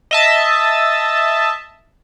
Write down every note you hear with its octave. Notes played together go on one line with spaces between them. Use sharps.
D#5 E5 A5